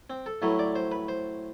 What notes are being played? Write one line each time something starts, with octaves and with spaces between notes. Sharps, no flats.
C4
A4
A2 F#3 A3 B4
D5
C5
B4
C5